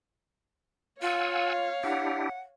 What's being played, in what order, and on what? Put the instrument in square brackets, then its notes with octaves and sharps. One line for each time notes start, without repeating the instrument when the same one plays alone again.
[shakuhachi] F4 [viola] C#5 F5 [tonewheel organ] F#5 G#5 E6
[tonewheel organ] D4 E4 G4 [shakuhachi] F#5